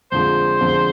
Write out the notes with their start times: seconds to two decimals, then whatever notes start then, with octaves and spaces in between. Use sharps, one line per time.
0.12 F2 D3 F3 G#3 C5
0.61 F2 D3 F3 G#3